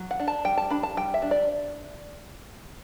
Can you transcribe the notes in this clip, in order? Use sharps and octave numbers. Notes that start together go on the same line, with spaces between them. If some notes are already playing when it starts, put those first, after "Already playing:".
Already playing: F#3
F#5
D4
A5
G3 G5
A5
D4 B5
A5
G3 G5
E5
D4
D5